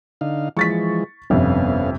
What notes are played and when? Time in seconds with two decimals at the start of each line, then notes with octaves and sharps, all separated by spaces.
0.21 D3 D#4 F5
0.57 E3 F3 G#3 C#6 A6 B6
1.30 G1 F2 C3 B3 C#4 F5